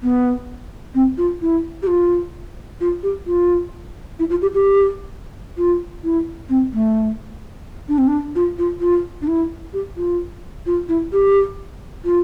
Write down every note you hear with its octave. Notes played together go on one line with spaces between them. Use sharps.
B3
C4
F4
E4
G4
F4
F4
G4
F4
E4
F4
G4
G4
F4
E4
C4
A3
D4
C4
D4
F4
F4
F4
D4
E4
G4
F4
F4
E4
G4
F4